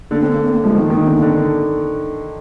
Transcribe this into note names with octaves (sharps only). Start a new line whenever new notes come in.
D3 A#3
C4
A#3
C4
A#3
F3 G#3
D#3 A#3
D#3 A#3
D3 C4
A#3
D3